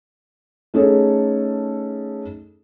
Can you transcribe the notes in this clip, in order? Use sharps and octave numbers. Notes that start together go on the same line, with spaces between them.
A3 C#4 D#4 G#4 A4